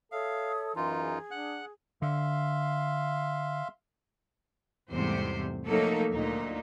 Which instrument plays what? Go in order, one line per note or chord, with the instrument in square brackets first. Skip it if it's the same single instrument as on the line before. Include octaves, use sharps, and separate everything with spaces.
[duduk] A4 [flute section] C#5 E5 D#6 [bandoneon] F5
[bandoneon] F#2 D#4 F4 [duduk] E3 [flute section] C6
[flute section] G#4
[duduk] D4 [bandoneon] F#5 F#6
[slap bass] D3 [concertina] E5 F5 C6
[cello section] E2 G#2 C3 G3 A3 C5
F3 F#3 A3 A#3 D#4 A4
D2 A#2 D#4